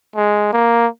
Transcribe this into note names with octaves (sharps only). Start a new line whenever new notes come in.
G#3
A#3